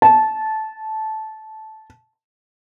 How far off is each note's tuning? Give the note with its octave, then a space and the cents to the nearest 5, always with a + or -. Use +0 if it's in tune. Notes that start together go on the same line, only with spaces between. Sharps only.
A5 -15